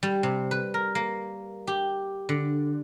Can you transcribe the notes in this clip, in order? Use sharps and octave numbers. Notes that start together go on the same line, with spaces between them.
G3
C3
B4
A#4
A#3
G4
D3